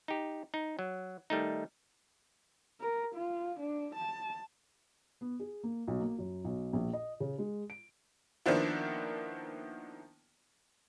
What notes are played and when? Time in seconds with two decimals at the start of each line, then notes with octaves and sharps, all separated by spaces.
0.08 D#4 G4
0.54 D#4
0.79 F#3
1.30 D#3 G3 A3 D#4
2.80 A#4
3.15 F4
3.60 D4
3.95 A5
5.21 B3
5.40 G#4
5.63 A#3
5.88 B1
6.00 A#3
6.19 F#2
6.45 B1
6.73 A#1
6.93 D#5
7.20 C#3
7.38 G#3
7.70 D7
8.46 D#3 F3 A#3 B3 D4 E4